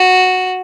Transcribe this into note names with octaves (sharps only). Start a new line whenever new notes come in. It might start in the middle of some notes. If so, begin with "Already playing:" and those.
Already playing: F#4